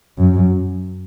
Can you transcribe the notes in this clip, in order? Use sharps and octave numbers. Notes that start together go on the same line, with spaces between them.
F#2